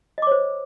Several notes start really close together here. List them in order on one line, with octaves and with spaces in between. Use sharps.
D#5 D6 C#5 C5